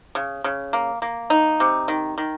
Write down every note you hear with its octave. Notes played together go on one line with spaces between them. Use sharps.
C#3
C#3
A#3
A#3
D#4
C3
D#3
D#3